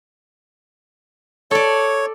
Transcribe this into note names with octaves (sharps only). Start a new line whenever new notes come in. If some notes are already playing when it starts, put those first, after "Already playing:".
A4 C#5 D5